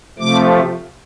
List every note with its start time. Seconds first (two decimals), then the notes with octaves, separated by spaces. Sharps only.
0.19 C3 F3 A3 D6